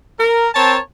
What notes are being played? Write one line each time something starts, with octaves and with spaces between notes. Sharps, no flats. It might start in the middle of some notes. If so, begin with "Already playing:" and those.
A#4
C4 A#4 C#5 A5